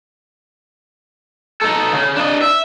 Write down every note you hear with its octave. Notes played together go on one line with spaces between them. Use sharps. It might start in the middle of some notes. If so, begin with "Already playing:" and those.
D#4 A4
C#3
D4 D#5
E5